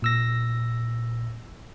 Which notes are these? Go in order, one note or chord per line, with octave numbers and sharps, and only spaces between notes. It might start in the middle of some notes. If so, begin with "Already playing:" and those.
A#2 E6 A#6